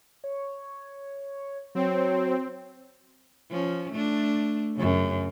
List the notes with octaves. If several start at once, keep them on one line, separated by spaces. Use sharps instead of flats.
C#5
F#3 C4 C#5
F3 C#4
A3 D4
F#2 C#3